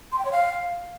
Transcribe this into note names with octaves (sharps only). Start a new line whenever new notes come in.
C6
G5
C#5
F5